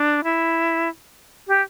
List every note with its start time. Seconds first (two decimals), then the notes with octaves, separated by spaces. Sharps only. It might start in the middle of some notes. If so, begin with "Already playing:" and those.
Already playing: D4
0.24 E4
1.47 G4